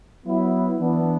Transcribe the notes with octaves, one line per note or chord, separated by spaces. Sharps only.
F#3 B3 E4
E3 B3 D4